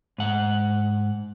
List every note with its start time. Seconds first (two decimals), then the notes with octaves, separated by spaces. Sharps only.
0.18 G#2 F#5